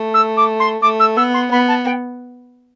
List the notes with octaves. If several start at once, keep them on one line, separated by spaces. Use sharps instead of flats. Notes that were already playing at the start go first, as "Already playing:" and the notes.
Already playing: A3
E6
D6
C6
A3 D6
E6
B3 E6
C6
B3 B5
A5
G5